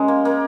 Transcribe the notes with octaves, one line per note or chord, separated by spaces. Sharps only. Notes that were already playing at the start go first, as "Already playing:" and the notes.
Already playing: G#3 C#4 A#4
A#3
A#3